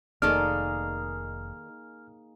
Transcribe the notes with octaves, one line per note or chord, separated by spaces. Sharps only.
F1 D#3 A#3 D#4 G#4 A4 D5 F6